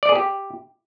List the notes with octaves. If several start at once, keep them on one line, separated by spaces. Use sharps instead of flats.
D5
G#4
G4